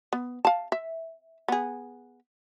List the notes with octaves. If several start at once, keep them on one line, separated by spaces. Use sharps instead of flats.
B3
F5 A5
E5
B3 G#4